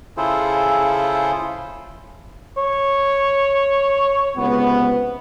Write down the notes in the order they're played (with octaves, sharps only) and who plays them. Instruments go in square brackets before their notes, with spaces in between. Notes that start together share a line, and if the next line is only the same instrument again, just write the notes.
[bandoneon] C#3 E4 F4 G#4 A4 C5
[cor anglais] C#5
[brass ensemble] C#2 C3 B3